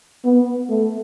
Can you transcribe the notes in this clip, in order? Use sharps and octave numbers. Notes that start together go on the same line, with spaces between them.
B3
A3